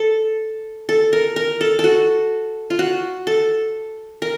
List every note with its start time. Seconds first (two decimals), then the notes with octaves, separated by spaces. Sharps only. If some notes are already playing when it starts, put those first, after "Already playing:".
Already playing: A4
0.89 A4
1.13 A#4
1.36 A#4
1.61 A4
1.79 A4
1.84 F#4
2.70 F4
2.79 F#4
3.27 A4
4.22 A#4